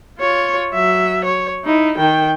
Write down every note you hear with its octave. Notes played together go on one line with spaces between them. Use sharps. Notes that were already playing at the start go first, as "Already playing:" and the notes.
F4 C#5
F#3 E5
C#5
D#4 E4
D#3 G5